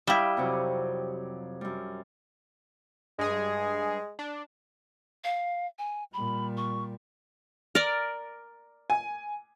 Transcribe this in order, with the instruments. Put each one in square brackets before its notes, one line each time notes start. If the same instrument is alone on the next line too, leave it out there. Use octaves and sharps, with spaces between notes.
[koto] G3 E4 [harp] F5 G5 D#6
[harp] F2 C3 F#3
F#2 G3
[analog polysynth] G2 G#4 [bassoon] G#3
[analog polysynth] D4
[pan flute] F5
G#5
[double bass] A#2 G3 [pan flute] B5
[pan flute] C#6
[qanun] A#4 D5
[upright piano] G#5